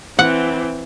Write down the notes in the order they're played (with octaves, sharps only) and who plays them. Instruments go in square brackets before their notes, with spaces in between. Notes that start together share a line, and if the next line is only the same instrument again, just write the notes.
[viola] E3 C4 [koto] F#5